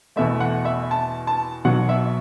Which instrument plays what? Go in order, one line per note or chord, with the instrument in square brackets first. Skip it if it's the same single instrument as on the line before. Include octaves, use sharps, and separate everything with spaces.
[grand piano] E2 B2 A3 E5
F#5
E5
A5
A5
B1 B2 F#3 F#5
E5